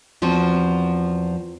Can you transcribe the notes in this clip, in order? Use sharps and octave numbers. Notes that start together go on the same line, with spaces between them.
E2 F3 C4 F#4